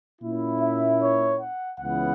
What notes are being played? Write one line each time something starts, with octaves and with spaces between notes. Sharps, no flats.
A#2 A#3 C#4 E4
E5
C#5
F#5
C#2 C#3 E3 B3 E4 F#5